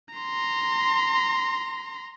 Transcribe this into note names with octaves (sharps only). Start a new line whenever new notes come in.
A#5 C6